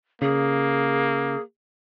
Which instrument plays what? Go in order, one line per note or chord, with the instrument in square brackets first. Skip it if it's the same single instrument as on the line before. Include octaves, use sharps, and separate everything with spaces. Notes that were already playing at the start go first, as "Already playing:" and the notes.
[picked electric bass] C#3 [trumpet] A#3 [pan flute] G#4